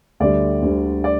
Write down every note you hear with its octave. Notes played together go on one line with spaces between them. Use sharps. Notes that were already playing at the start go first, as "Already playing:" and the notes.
D2 D3 G3 D5
D2 D3 G3
D5